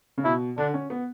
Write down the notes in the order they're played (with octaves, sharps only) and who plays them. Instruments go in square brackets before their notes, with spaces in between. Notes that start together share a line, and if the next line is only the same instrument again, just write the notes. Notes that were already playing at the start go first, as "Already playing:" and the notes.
[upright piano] C#3
[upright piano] B2 [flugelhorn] E4
[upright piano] D3 [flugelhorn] D4
[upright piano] C#4
B3